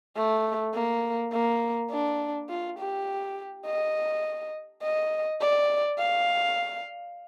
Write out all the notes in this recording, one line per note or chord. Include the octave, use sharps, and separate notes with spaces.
A3
A#3
A#3
D4
F4
G4
D#5
D#5
D5
F5